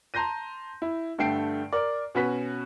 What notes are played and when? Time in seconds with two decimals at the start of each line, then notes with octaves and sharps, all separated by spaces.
0.14 A5 A#5 C6 G6 A#6 D#7
0.82 E4
1.19 G2 D3 A3 G5 C7 D7
1.73 A#4 D5
2.15 B2 C#4 F#4 B4 B6